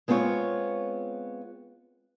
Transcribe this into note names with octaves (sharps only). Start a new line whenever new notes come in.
G#3 B3 C4 F4 C#5